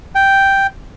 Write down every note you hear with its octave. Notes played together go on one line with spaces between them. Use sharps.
G5